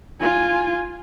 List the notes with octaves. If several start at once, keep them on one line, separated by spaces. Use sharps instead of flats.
F4 G#5